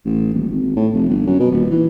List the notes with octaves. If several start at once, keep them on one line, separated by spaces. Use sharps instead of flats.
A1
D#1
G#1
A2
F1
G1
F#2
B2
D#1
E3